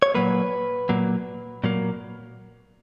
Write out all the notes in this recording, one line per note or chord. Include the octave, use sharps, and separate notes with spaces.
C#5
A#2 F#3 A#3 B4
A#2 F#3 A#3
A#2 F#3 A#3